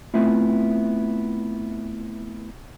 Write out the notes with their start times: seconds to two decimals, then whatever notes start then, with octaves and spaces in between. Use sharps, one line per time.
0.14 A3 B3 C4 E4 F4